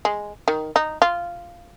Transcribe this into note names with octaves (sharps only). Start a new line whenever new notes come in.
G#3
D#3
D#4
F4